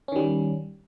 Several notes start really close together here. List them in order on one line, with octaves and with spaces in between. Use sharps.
C#4 D#3 G3